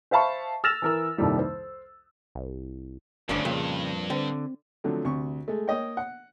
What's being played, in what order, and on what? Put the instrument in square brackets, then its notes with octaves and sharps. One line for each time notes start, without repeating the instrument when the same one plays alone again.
[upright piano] C5 E5 F5 A5 B5 C#6
E6 F6 A6 A#6 E7 F7
E3 A#4 E6
C2 F2 D#3 G3 A#3
C5
[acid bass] C2
[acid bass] F#1 [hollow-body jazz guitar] D2 C#4 D4 [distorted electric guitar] G2
[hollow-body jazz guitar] F2 A#2 [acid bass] C#3
[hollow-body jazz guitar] D3 [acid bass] C4
[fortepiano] D3 F3 F#3 A3 C4
D2 C3 C#6
G#3 A3
A#3 C#5 D#5 G5
F#5